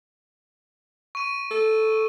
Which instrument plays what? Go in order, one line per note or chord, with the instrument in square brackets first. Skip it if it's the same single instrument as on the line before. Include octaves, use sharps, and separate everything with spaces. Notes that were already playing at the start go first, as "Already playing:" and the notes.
[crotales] C#6 D#7
[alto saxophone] A4